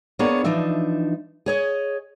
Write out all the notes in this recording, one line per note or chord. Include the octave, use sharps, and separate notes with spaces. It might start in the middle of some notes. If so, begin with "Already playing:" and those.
A#3 B3 D4 G#4 C#5
E3 F3 D4 D#4 E5
G#4 C#5 D#5